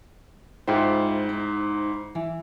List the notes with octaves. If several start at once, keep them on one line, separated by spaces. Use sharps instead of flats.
G#2 E4 F4 C5 E5 G5
D#4
E3